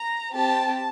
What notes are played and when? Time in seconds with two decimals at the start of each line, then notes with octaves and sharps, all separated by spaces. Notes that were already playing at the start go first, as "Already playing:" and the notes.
Already playing: A#5
0.33 C4 G4 A5